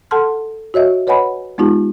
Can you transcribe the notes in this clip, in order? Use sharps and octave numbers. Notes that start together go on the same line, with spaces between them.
A4 F#5 A5 C6 F6
F#4 C#5 D#5 E5
B4 C#5 D#5 F#5 G#5 B5
G#3 B3 D#4 F4 G4